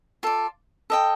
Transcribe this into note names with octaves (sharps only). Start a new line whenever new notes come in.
F4 A4 D5
A4 D#5 G5